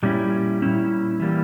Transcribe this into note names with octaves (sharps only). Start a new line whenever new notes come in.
A#2 G3 C#4 E4
A#2 G3 C#4 E4
E3 G3 A#3